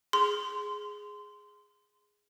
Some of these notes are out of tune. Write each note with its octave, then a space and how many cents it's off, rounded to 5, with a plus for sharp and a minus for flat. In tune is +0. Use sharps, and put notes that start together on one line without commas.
G#4 +0 C6 -15